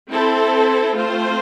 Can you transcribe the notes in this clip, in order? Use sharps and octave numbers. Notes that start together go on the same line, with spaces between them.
C4 E4 A4 C5
A3 C4 F4 C5